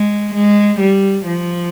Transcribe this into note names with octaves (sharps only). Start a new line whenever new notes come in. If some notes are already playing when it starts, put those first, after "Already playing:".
Already playing: G#3
G#3
G3
F3